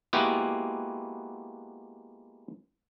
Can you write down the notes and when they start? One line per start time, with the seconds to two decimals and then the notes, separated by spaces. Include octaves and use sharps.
0.13 G#3 A#3 B3 E4 F#4 G4